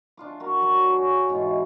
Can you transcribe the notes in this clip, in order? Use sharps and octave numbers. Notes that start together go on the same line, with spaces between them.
D4 F4 D6
F#4 A#4
F#3 F#4
G#4 C#5
G#2 B2 E3 F4